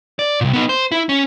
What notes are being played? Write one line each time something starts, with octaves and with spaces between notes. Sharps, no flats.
D5
C2 A#2
B3 D#4
C5
E4
C#4